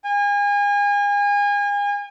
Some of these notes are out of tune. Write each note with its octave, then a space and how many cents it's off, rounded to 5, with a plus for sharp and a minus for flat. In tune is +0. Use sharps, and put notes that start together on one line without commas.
G#5 -35